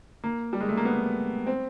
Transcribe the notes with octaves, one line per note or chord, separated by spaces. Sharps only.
A#3
G3
G#3
A3
A#3
B3
C4